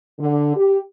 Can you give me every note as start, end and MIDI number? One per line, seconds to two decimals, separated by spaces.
0.19 0.54 50
0.56 0.78 67